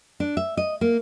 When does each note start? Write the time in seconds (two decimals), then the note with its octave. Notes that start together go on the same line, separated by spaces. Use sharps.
0.20 D4
0.37 E5
0.57 D#5
0.81 A#3